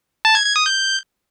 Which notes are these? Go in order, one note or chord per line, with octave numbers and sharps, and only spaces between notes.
A5
G#6
G#6
D#6
G6